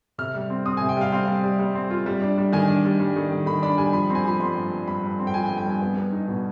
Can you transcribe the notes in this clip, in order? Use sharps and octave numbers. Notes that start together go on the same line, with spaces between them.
C3 F6
G3
C4
C4 D#6
C3 G#5
G5
G3 F5
C4 F5
G3
G3
G3
C4
F4
G3
D4
G3
D#3 G#5
D4
G3
G3
D#3
D#3
D#3 B5
D4 B5
G3 G#5
F3 B5
C4
G#5
F3 B5
G2 C6
G2
G2
G2 B5
G2
C4
G5
F3 G#5
G5
G2
G5
G2 G#5
B3
B3
D#4
B2